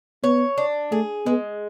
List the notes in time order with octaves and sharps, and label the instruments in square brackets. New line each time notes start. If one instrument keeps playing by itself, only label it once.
[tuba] B3 [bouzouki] C#5
[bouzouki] D4
[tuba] A3 [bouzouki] G#4
[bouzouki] G#3 [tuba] B3